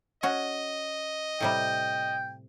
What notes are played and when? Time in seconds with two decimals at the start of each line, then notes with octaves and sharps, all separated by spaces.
0.23 C#4 F#4 D#5
1.41 A2 C3 G3 G5